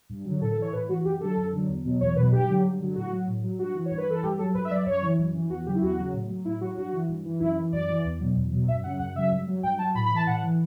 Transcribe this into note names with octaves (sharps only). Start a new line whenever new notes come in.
G2
D3 F#3
A2 A4
A4
E3
C#5
A2 B4
E3 F#4
F#2 G4
D3 F#3 A4
F#2
D3 F#3
E2
B2 F#3
E2 C#5
B2 F#3 B4
G2 G4
D3 F#3
G2
D3 F#3
A2 F#4
F#3
A2
F#3
G2 F#4
E3
C#5
G2
B4
E3 A4
G2 G4
F#3 A4
G2 B4
E5
F#3 D5
F#2 C#5
E3
F#2
E3
E2 F#4
C#3 F#3 G4
E4
E2 F#4
C#3 F#3
A2
F#3
A2 E4
F#3 F#4
G2 F#4
E3
G2
E3
F#2 E4
E3
F#2 D5
E3
E2
B2 F#3
E2
B2 F#3
F#2 E5
C#3 F#3 F#5
F#2 F#5
C#3 F#3 E5
G2
F#3
G2 G5
F#3 A5
A2 B5
B5
E3
A5
A2 F#5
E3